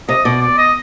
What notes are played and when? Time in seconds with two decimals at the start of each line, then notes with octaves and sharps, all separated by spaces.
0.09 C3 D#5
0.25 B2 D5
0.41 D5
0.57 D#5